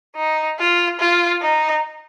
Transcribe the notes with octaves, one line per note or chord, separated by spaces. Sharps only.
D#4
F4
F4
D#4